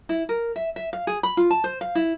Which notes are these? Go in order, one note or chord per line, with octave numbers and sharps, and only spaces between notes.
E4
A#4
E5
E5
F5
G#4
B5
F4
A5
C5
F5
E4